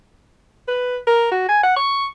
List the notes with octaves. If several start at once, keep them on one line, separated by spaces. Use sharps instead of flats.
B4
A#4
F#4
G#5
F#5
C#6